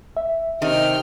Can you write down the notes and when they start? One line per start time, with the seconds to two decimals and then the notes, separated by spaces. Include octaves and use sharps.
0.17 E5
0.62 C3 D#3 G5 F6